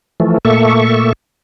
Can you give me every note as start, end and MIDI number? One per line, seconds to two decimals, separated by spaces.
0.20 0.38 52
0.20 0.38 53
0.20 0.38 57
0.45 1.13 46
0.45 1.13 57
0.45 1.13 58
0.45 1.13 69
0.45 1.13 76
0.45 1.13 85